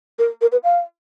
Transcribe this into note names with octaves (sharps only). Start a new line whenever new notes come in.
A#4
A#4
B4
F5